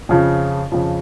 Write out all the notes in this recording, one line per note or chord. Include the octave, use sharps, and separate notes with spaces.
F2 C#3 F3
F2 C#3 F3